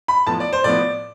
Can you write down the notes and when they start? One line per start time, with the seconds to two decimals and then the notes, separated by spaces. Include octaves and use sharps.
0.08 B5
0.27 A2 F3 B3 A5
0.40 D5
0.53 C5
0.64 A2 F3 B3 D5